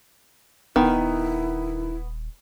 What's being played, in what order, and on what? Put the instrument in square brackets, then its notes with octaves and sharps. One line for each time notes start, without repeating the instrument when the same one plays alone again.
[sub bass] D#1 [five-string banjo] D#3 [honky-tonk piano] B3 [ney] E4